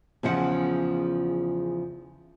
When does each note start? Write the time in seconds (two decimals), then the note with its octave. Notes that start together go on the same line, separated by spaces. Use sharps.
0.23 E2 C#3 F3 F#5